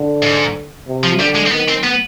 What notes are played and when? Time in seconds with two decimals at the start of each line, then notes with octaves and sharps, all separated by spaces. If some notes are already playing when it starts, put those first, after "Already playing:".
Already playing: D3
0.22 G#2
0.88 C3
1.04 F3
1.19 D3 G3
1.35 G#3
1.46 C4
1.51 D#3 B3
1.68 C4
1.83 B3